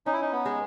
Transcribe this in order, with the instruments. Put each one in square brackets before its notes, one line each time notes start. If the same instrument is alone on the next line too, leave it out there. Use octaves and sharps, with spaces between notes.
[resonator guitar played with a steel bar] C#4 [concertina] D#4
[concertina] E4
D#4
B3
[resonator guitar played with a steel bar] G#3